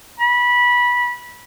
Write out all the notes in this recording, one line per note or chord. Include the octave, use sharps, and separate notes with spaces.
B5